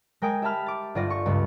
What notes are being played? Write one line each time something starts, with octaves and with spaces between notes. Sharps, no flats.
G#3 A#4 G5 G#5 D#6 D7
G4 E5 G5 A5 B5 F6
D6 A6
G1 G3 F4 D5 A#6
C#6
C#2 G2